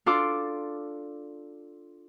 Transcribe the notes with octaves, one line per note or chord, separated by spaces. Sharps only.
D4 F4 A4 C6 D6